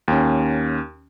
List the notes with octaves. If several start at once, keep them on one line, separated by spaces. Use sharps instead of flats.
D#2 C#4